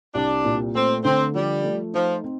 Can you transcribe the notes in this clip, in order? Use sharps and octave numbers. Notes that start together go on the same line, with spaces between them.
C2 D4
A#2
A3 C4
D3 C4
F3 G3
A3
F3 D#4
C4